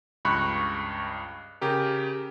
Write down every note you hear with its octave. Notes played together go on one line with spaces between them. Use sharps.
C#2 G2 B5 C#6 F#6 C#7
C#3 G4 A#4